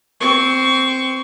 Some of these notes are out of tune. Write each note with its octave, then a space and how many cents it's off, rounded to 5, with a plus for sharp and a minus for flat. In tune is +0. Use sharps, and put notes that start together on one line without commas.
C4 +0 C#6 +25